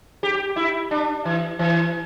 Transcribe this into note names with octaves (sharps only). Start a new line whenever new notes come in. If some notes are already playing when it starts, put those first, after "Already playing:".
G4
E4
D4
E3
E3